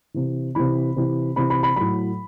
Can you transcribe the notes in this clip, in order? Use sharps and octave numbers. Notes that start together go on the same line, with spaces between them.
C3 E3
C3 E3 B5
C3 E3
C3 E3 B5
B5
B5
A2 F#3 B5